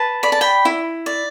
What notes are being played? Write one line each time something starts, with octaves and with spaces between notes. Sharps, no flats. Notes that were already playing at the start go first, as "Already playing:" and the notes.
Already playing: B4 A5
D5 B5
A5
G5 B5
E4
D5